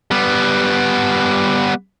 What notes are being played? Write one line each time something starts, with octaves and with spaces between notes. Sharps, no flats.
G3 B3